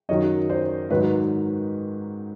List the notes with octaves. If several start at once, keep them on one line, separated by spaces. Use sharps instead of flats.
F#2 D#3 F#3 C#5 D#5
C5 D5
G#2 D#3 F#3 B4 C#5